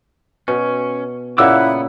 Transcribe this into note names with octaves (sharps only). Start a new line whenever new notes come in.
B2 C#4
A#2 C#3 E4 E5 F#5 D6 E6
B3